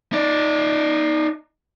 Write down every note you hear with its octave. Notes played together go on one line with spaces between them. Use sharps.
D#4 D5